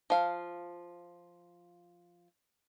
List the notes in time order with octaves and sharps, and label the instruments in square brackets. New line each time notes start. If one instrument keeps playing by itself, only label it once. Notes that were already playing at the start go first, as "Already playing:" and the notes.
[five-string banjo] F3 F5